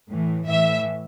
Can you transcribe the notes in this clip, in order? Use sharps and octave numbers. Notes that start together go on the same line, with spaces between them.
A2 E3
A2 E3 E5